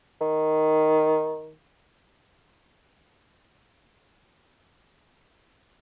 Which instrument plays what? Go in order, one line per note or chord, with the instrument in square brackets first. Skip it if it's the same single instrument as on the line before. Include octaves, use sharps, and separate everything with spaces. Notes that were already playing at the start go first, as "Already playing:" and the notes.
[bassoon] D#3